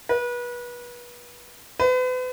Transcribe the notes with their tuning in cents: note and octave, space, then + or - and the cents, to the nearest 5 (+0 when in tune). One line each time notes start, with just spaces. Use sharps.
B4 -30
B4 +40